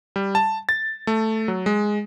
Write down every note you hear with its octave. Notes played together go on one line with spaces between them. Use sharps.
G3
A5
A6
A3
F#3
G#3